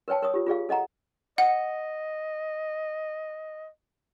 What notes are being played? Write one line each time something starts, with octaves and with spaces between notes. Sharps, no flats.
A#4 B4 C#5 G5 A5
A#4 C#5 D#6
F4 G4
F4 G#4 D5 F5
A4 D#5 F#5 A#5
D#5 F#5